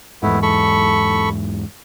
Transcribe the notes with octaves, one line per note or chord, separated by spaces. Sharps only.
E2 G#2 A3 B3 E4
A4 B5 C#6